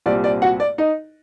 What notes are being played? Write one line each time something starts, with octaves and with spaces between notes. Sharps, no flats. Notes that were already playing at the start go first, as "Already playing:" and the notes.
C2 A#2 G3 C4 D5
D5
F#4 F#5
D5
D#4 D#5